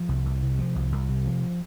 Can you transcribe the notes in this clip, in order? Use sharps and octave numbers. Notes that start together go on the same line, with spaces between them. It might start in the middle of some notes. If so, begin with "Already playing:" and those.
Already playing: F3
C2
C2
C3
F3
C2
C2
C3
F3